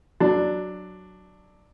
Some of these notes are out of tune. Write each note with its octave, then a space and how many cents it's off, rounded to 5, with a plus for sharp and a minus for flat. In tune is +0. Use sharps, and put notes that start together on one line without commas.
F#3 +5 D4 +10